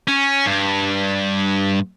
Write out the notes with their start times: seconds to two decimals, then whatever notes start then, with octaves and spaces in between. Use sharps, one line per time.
0.08 C#4
0.47 G2